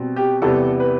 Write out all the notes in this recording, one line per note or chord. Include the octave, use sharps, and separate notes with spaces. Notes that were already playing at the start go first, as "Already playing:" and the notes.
Already playing: B2 G3 C4
G4
E2 C3 G3 B3 A4
B4